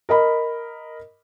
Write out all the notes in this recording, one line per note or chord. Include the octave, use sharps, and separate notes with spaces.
A#4 D#5 B5